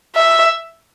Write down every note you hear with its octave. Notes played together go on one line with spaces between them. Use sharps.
E5